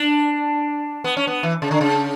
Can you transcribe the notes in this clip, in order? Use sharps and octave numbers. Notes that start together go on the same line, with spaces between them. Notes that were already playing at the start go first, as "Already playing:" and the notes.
Already playing: D4
B3
C#4
B3
E3
C#3
D3
C#3